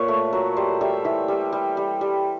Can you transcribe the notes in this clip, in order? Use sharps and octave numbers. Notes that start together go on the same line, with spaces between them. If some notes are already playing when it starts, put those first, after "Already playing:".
Already playing: A#2 B4 C#5 E5
A3
F#3
G3 C5
G3 E5
E3 E5
G3
G3
G3
G3